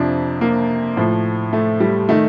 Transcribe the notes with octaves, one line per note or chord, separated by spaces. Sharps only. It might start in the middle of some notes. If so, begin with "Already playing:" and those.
Already playing: F2 C3 F3 D4
A#3
A2 F3
A3
G3
D#3 A3